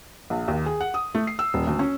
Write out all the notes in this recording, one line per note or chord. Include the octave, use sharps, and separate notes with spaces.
A#1
D#2
G#4
F#5
D#6
A3
C7
E6
D#1
D2
C#4